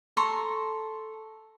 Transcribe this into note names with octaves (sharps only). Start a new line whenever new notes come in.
A4 A#5 C6 C#6